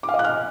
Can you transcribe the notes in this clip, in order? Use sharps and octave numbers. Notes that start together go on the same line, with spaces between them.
D6
F5
D#5
F#6
F6